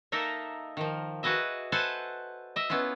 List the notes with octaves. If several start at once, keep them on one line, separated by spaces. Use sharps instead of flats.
A#3 D#4 A4 A#4 E5
D#3 F3
F#4 G#4 B4 D#5 E5
A4 B4 C5 F#5 G#5 A5
D#5 E5
B3 C#4 E4 F4